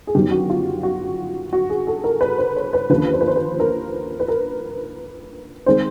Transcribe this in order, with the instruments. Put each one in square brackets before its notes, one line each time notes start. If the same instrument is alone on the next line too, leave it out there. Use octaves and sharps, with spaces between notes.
[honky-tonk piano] G#4
G1 F#2 D#3 F#3 G4
F#4
F4
F#4
F#4
G#4
A4
A#4
B4
C5
C#5
B4
D#2 D3 F3 A#3 C#4 B4
C5
B4
C5
B4
A#4
B4
A#4
D#3 G#3 C4 C5